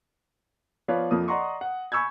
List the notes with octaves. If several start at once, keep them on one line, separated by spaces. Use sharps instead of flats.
F3 B3 B4 C#5 D5 F5
F2 F3 A#3 D#6
D5 D#5 F#5 A#5 C6 C#6
F#5
G#5 B5 C#6 E6 G6 G#6